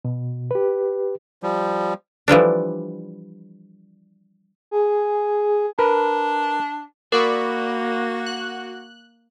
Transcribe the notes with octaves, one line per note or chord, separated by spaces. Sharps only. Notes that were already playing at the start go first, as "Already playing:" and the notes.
B2
G4 B4
F3 G3
E3 F3 G3 D4
G#4
D4 A#4 B4
A#3 F#4 A#4 D5 B5 C#6
F#6